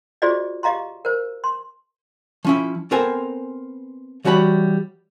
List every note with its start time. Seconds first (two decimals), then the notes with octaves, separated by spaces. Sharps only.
0.22 F4 F#4 G#4 C5 D5 D#5
0.63 G4 D#5 F5 A#5 C6
1.05 A#4 C5
1.44 C6
2.45 F3 C#4 E4
2.91 B3 C4 A4 A#4 C5 G#5
4.25 E3 G3 F#4 C#5 A5 B5